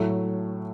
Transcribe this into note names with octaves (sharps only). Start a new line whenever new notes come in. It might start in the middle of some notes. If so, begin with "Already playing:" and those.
Already playing: A2 F#3 A3